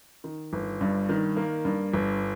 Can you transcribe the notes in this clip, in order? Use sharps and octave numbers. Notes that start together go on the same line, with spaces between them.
D#3
G1
G2
D#3
A#3
G2
G1